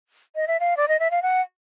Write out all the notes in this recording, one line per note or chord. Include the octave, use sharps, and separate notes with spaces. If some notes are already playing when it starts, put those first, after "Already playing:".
D#5
E5
F5
D5
D#5
E5
F5
F#5